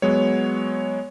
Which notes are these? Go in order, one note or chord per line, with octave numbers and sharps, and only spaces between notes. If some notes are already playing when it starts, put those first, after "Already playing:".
F#3 G#3 B3 C#5